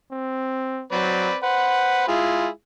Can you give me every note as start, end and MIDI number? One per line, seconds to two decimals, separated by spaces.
0.11 0.83 60
0.92 1.30 54
0.92 1.35 60
0.92 1.35 71
0.92 1.35 74
1.43 2.07 71
1.43 2.07 72
1.43 2.05 78
2.08 2.49 56
2.08 2.49 64
2.08 2.49 65
2.08 2.49 68